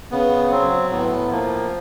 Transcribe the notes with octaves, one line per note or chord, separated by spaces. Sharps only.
C#3 B3
F#3 C4
A2 B3
F3 A#3